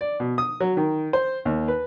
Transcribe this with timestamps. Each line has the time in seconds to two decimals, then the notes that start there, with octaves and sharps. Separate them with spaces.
0.01 D5
0.20 B2
0.38 D#6
0.60 F#3
0.77 D#3
1.13 C5
1.45 D#2
1.68 B4